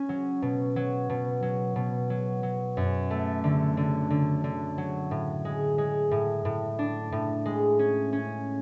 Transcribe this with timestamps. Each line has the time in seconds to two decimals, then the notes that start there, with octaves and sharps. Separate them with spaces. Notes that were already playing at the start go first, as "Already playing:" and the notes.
Already playing: C#4
0.09 F#3
0.42 B2
0.76 F#3
1.10 B2
1.43 F#3
1.76 B2
2.10 F#3
2.43 F#3
2.77 F#2
3.10 A3
3.44 D3
3.77 D3
4.10 D3
4.44 D3
4.78 F#3
5.11 A2
5.45 G#3
5.78 G#3
6.11 A2
6.45 A2
6.79 D4
7.12 A2
7.45 G#3
7.79 C#4
8.13 C#4